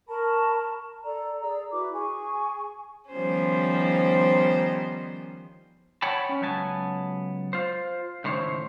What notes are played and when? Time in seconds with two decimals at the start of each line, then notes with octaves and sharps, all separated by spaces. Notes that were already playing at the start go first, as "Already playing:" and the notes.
0.07 A#4 A5 B5 C#6
1.03 A4 D5 A#5
1.41 G#4 D5 A#5 E6
1.70 E4 F#4 B4 D6
1.93 G#4 G#5 C#6
3.11 D#3 F3 G3 B3 C#4 C5
6.02 C#5 F#5 G5 A5 B5
6.29 C#4
6.41 C#2 F#3 B3 G#5 A5
7.53 F4 C5
8.24 C#2 A2 D#3 C5 C#5